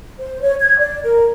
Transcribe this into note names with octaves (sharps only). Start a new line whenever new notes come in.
C5
C#5
G#6
D5
A#4